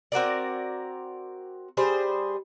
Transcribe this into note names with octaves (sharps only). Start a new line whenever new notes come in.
C4 F#4 A#4 D5
G3 G#4 C5